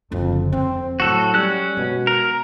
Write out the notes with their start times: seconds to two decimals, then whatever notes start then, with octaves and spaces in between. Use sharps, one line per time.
0.12 F#1 F2 D3
0.52 F2 C4
1.00 A2 F#3 F#4 A4
1.34 G3 C#4 F#6
1.77 B2 G#3
2.07 A#4